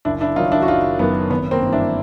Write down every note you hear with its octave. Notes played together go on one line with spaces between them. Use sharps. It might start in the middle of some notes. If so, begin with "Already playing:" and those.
F#1 D4 E4
D4 E4
F#2 D#3 F#3 D#4 F4
D4 E4
F#4
F#1 D#4 F4
F#2 D#3 F#3 B3
G#1 B3
A#3 C4
G2 E3
D4 E4